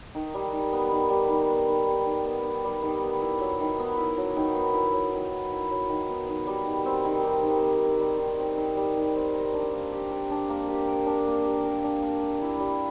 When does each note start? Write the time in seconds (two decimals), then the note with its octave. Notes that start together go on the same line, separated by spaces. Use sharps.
0.15 D#3
0.34 G3
0.53 D#3
0.72 B3
0.91 D#3
1.10 G3
1.29 D#3
1.49 B3
1.69 D#3
1.87 G3
2.06 D#3
2.25 B3
2.44 D#3
2.64 G3
2.82 D#3
3.03 B3
3.22 E4
3.40 F#3
3.60 D#3
3.79 B3
3.97 E4
4.17 F#3
4.37 D#3
4.56 B3
4.74 E4
4.93 F#3
5.13 D#3
5.32 B3
5.52 E4
5.71 F#3
5.89 D#3
6.09 B3
6.28 D#3
6.47 G3
6.67 D#3
6.85 C4
7.05 D#3
7.24 G3
7.43 D#3
7.62 C4
7.81 D#3
8.00 G3
8.19 D#3
8.39 C4
8.57 D#3
8.77 G3
8.97 D#3
9.16 C4
9.34 A#4
9.54 D4
9.73 A#3
9.92 G4
10.11 A#4
10.31 D4
10.50 A#3
10.68 G4
10.87 A#4
11.06 D4
11.27 A#3
11.46 G4
11.64 A#4
11.84 D4
12.02 A#3
12.22 G4
12.42 E4
12.60 G3